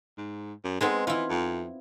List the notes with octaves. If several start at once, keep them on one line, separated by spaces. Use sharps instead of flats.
G#2
F#2
G#3 B3 C4 D#4
E3 E4 F4
F2